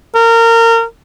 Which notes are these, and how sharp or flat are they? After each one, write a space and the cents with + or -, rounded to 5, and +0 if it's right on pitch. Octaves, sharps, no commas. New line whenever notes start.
A#4 -25